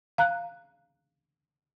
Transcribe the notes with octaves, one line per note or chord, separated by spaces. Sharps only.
F5 A#5 F#6